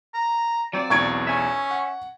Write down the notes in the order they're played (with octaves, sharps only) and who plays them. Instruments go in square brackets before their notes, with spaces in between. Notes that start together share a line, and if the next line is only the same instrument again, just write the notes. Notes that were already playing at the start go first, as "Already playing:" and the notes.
[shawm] A#5
[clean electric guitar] F#3 C4 F4 [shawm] D5
[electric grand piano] B1 E2 [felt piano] C#6 G#6 D7
[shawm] C#4 [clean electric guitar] E5 G#5
[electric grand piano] F#5